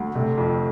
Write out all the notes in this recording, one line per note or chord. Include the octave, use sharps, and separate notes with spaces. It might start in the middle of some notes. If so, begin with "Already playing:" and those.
Already playing: D2
C3 A3
F2